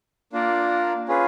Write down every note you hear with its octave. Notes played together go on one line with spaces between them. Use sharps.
A#3 D4 F4 A#4 D5
C#4 F4 G#4 B4